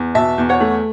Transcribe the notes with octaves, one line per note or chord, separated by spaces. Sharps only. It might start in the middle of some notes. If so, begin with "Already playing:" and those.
Already playing: E2
B2 E5 A5
E2
C#5 F#5
A3